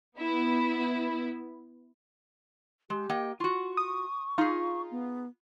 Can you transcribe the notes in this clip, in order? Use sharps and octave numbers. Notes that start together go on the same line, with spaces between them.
B3 E4
G#3 G4
A#3 D#5 G5
F4 F#4 C#6
D#6
D#4 F4 G#4
B3